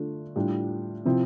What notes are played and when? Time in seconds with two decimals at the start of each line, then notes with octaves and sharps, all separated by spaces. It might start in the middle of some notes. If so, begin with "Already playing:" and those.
Already playing: D3 A3 D4 F4
0.36 A2 G3 D4 F4
1.05 C3 F3 C4 E4